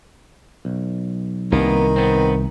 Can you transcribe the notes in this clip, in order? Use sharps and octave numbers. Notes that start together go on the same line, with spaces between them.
B1
C2 D#3 A#3 B3
B3 C4